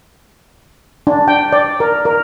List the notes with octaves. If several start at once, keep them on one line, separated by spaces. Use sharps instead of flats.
D4
G5
D5
A#4
A#4